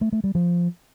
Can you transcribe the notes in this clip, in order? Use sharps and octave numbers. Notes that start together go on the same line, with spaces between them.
A3
A3
G3
F3